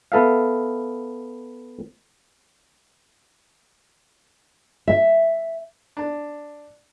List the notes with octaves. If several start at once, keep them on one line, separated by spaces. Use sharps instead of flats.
B3 A4 E5 F5
E5
D4